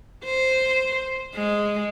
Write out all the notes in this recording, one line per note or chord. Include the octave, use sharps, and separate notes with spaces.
C5
G#3